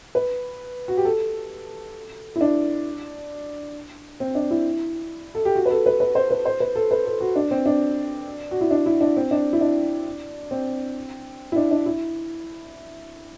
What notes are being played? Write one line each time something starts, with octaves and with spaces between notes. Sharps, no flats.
B4
F#4
G4
A4
E4
D4
C4
D4
E4
A4
G4
F#4
B4
A4
B4
B4
C5
B4
C5
B4
A4
B4
A4
F#4
D4
C4
D4
F#4
E4
D4
E4
D4
C4
D4
E4
D4
C4
E4
D4
D4
E4